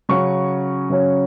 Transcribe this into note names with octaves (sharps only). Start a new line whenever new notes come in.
C#3 F#3 C#4 C#6
C#3 F#3 C#4